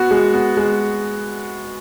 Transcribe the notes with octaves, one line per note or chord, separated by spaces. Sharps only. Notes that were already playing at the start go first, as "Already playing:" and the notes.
Already playing: B3 F#4
G#3
B3
G#3